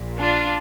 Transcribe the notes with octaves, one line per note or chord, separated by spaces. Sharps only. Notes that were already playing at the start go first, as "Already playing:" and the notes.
Already playing: A#1 A#2
D4 F4